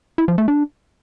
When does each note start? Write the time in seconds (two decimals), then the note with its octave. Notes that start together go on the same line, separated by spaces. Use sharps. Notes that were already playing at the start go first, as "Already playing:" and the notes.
0.18 E4
0.28 F3
0.38 A3
0.48 D4